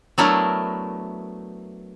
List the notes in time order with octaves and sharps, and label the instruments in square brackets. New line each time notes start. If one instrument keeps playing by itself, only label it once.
[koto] F#3 A3 B3 D4 E4 A#4